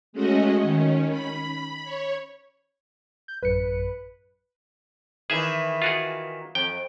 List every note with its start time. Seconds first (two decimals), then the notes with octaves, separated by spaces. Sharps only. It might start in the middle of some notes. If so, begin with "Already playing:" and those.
0.13 G#3 A3 C#4 F#4 D#5
0.62 D#3 C#4
1.10 B5
1.85 C#5
3.28 G6
3.42 A1 F#2 B4 C#7
5.30 D#3 E3 E4 G#4 E5
5.82 F4 F#4 G#4
6.55 F2 G5